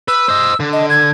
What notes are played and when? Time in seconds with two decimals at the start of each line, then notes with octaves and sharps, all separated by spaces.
0.08 B4 E6
0.29 C5 D#5
0.60 D3
0.73 D#5
0.90 G#6